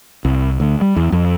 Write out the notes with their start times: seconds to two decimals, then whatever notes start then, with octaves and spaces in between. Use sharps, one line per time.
0.25 C2
0.60 D2
0.81 G3
0.96 E2
1.12 F2